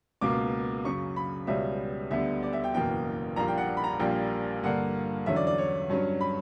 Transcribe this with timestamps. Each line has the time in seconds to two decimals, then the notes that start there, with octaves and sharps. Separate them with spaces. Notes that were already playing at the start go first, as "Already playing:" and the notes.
0.21 C#2 B2 A#3 D6
0.85 F#2 C#3 F#3 C#6
1.16 B5
1.47 C#2 B2 G3 C#4 E5
2.11 D2 D3 G3 B3 E5
2.43 D5
2.53 E5
2.64 G5
2.74 F#1 E2 B2 A#3 G5
3.36 A#1 A#2 G3 A#3 A#5
3.48 G5
3.58 F#5
3.77 B5
3.84 A#5
4.00 A#1 A#2 G3 A#3 G5
4.63 G2 D3 A#3 F#5
5.26 E2 D3 F#3 C#4 E5
5.36 D5
5.47 D5
5.58 C#5
5.90 G2 F#3 C#4
6.21 B5